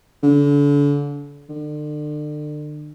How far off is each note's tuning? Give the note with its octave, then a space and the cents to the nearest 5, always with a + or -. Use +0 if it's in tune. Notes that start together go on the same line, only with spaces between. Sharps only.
D3 -35
D3 +35